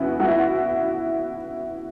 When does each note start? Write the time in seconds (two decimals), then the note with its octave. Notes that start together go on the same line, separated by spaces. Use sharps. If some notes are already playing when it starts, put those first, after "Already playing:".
Already playing: E2 B3 C#4 E4 F#4
0.20 F#4
0.28 E4